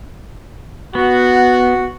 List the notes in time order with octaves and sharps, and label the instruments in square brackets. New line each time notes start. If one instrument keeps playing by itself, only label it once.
[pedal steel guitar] B3 [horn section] F#4